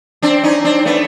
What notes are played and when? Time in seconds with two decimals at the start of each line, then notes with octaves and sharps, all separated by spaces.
0.22 C4 D4
0.43 C#4 D#4
0.64 C4 D4
0.85 A3 B3